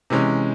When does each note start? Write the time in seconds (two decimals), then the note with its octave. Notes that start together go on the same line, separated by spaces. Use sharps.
0.10 C3 E3 G#3 C#4